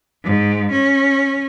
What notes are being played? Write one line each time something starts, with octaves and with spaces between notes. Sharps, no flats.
G#2
C#4